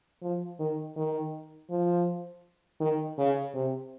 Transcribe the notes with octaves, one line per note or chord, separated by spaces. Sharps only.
F3
D#3
D#3
F3
D#3
C#3
C3